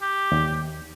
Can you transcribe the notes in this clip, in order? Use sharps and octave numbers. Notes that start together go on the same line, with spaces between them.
G4
D#2